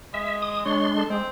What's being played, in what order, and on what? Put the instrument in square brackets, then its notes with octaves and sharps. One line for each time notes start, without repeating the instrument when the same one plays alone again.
[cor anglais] G#3 [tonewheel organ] E5
[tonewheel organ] D#6
[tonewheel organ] G#3 D4 C6 [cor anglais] C#5
[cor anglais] A4
[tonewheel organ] G#3 [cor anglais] C4